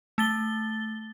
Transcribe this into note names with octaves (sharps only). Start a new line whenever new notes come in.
A3 A6 G7